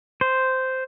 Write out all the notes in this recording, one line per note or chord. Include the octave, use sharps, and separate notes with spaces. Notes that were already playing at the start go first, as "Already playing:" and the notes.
C5